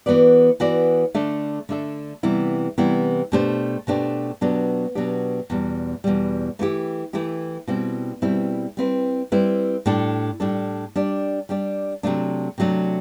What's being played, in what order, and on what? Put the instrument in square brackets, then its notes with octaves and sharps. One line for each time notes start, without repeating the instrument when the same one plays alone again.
[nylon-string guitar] E3 B3 F#4 B4 D5
E3 B3 F#4 B4 D5
D3 A3 D4 A4 E5
D3 A3 D4 A4 E5
C3 E3 G3 B3 E4
C3 E3 G3 B3 E4
B2 A3 D4 G4 C5
B2 A3 D4 G4 C5
B2 F#3 B3 D4 G4
B2 F#3 B3 D4 G4
E2 B2 G3
E2 B2 G3
E3 A3 E4 G4
E3 A3 E4 G4
B2 G3 C4 E4
B2 G3 C4 E4
G3 C4 E4 B4
G3 C4 E4 B4
A2 G3 D4 A4
A2 G3 D4 A4
G3 D4 G4 D5
G3 D4 G4 D5
C3 F#3 A3 D4
C3 F#3 A3 D4